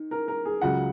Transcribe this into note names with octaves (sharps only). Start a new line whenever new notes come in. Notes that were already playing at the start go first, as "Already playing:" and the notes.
Already playing: D#3
A#4
A#4
G#4
C#2 C#3 F#3 F#5